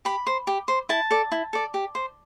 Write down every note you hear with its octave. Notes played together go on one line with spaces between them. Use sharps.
G4 B5
C5
G4
C5
E4 A5
A4 D5
E4
A4 D5
G4
C5